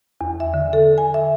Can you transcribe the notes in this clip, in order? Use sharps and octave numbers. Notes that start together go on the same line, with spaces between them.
E2
E5
D3
A4
G#5
E5